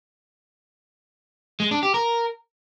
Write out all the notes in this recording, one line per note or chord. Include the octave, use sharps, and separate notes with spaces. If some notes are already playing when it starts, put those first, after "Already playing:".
G#3
D4
G4
A#4